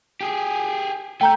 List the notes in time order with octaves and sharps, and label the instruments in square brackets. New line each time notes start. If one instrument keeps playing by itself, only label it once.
[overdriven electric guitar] G4 G#4
[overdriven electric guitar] A3 [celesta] G5 A#5 G6